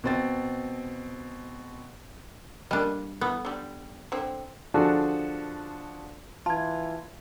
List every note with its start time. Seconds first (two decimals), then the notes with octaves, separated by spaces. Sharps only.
0.04 B2 C4 A6
2.71 G3 A#3 D4 D#5
3.21 E3 B3
3.45 D3 G3
4.12 D3 C4
4.74 D3 F3 D4 F#4 G#4 A4
6.46 E3 F4 A5 G#6